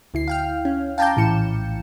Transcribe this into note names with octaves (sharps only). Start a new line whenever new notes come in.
D2 E4 C7
F5 G5 F6
C#4
F5 G5 A5 A#5 D6 G6
A#1 A2 E3 C#7 E7